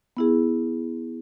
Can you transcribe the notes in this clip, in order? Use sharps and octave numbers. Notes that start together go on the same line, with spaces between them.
B3 E4 G#4